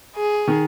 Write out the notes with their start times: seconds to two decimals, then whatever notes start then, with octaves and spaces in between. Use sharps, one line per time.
0.17 G#4
0.48 D#3